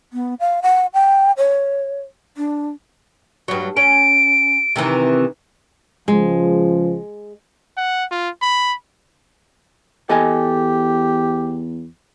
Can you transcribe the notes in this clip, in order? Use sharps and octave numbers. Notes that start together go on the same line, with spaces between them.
B3
F5
F#5
G5
C#5
D4
G2 F#3
C#4 D7
C3 D#3 E3
C#2 F3 G#3
F#5
F4
B5
E2 G4 A4 D#5 G#5